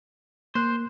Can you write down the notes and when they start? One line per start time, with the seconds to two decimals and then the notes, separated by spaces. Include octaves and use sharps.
0.55 A#3 C5 F#6